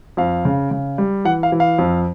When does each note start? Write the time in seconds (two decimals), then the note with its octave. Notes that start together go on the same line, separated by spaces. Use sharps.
0.17 F2 F5
0.45 C#3
0.71 C#3
0.98 G3
1.25 E3 F#5
1.43 F5
1.52 E3
1.60 F5
1.78 F2